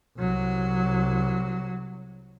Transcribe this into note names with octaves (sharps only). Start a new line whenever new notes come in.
C2 F#3